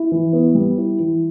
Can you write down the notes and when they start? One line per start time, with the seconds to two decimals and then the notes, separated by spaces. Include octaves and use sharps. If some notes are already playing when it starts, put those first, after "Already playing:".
Already playing: E4
0.12 E3
0.33 B3
0.55 G3
0.77 E4
1.00 E3